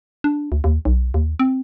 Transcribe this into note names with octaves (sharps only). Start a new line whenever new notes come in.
D4
D2
D#2
B1
D#2
C4